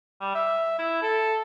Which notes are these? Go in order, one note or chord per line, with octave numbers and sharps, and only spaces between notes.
G3
E5
E4
A4